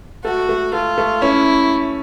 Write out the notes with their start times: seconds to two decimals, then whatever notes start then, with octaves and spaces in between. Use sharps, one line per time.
0.24 A3 F#4
0.49 A3
0.73 A3 F4
0.98 A3
1.22 C#4 E4